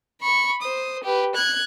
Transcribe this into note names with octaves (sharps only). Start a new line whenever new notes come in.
B5 C#6
C5 D#6
G4 B4
F#6 G#6